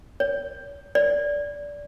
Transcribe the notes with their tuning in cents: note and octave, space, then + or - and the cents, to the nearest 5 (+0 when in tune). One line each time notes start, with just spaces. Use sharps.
C#5 +40
D5 -15